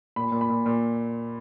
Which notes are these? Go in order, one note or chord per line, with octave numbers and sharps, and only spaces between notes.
A#2 B5
A#2
B5
A#2
A#2